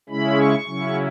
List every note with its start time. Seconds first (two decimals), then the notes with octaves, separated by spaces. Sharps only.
0.09 C#3 G#3 C#4 E4 B5
0.38 C#6
0.66 C#3 F#3 C#4 E4